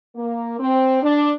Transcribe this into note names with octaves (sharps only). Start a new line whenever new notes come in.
A#3
C4
D4